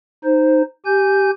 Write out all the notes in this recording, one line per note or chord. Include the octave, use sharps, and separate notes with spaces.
D#4 C5
G4 G#5 G6